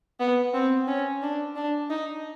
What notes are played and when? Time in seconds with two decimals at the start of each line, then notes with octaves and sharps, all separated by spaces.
0.20 B3
0.54 C4
0.88 C#4
1.22 D4
1.56 D4
1.90 D#4